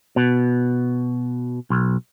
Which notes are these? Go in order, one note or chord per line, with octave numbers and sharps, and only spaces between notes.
B2
B1